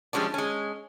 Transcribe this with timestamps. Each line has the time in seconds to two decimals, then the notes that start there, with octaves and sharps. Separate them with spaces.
0.13 F3 G3 G#3 C#4 D4
0.34 G#3 C#4